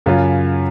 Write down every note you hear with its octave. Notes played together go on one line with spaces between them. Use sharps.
F#2 C#3 F#3 C#4 F4